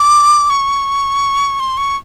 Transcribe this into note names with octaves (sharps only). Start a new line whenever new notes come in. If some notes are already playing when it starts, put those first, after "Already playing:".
Already playing: D6
C#6
C6
C#6